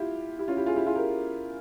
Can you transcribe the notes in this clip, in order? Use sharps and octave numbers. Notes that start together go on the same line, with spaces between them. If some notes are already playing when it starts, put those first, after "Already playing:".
Already playing: E4 F4 G4
E4 G4
C#4 F4
E4 G4
F4 G#4
E4 G4
F4 G#4
G4 A#4